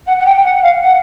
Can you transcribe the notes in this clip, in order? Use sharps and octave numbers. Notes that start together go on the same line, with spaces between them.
F#5
F#5
G5
G5
F#5
F#5
F5
F#5